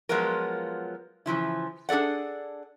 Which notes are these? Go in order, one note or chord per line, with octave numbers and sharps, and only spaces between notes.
F3 F#3 G#3 B3 F4 A#4
C#3 E3 F3 E4
D4 G#4 A4 D5 F#5